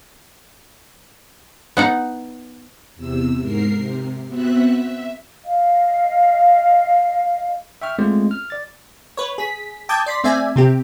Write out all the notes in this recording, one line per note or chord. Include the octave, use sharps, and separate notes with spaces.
B3 D#4 F#5
E2 C3 E6
G#2 A#4 C7
C3
B3 C4 F#4 E5 F#6
E5
D#5 F5
E5 G5 C#6 F6
G#3 A3 C4 C#4 F4
F6
D5 A6
B4 C#5
G#4 B6
G5 A5 D6 D#6 G6 G#6
D5 C6 B6
A3 C4 D5 E5 G#5
C3 C4 G4